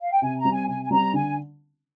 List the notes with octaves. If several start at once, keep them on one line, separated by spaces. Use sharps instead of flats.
F5
G5
C3 G#5
A#5
G3 C4
G#5
C3 G#5
G#5
G3 C4 A#5
D3 G#5